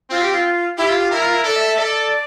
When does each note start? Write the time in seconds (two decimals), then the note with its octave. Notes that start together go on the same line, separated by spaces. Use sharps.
0.10 C4 F4
0.21 G4
0.33 F4
0.78 E4 G4
0.89 F4
1.00 F4
1.11 E4 A#4
1.22 F4
1.33 E4
1.44 A4 D5
1.56 E5
1.67 E5
1.78 A4 D5